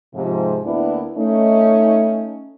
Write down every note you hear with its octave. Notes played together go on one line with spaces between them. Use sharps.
G#2 C3 F3
D2 A#3 B3 D4 E4
A3 C#4 D#4